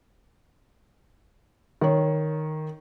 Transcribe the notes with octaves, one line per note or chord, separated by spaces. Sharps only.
D#3 C#5